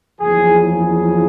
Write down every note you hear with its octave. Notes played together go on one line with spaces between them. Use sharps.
F#1 E2 C#3 F3 G#4
G#4